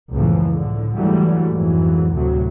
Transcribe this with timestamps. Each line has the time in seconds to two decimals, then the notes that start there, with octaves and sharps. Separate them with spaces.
0.11 C#2 F#2 A2 E3 F3 A#3
0.48 A2 D3
0.95 G#2 D3 E3 F#3 G3 A3
1.49 A#1 F2 G#2 E3 F#3
2.14 D2 A2 C3 F#3